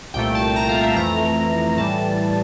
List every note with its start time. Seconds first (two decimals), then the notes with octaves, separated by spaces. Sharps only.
0.14 C2 A#2 A3 G5
0.35 A5
0.56 A#5
0.69 F5
0.83 E5
0.96 F2 E3 A3 A#5
1.77 A2 E3 G3 A5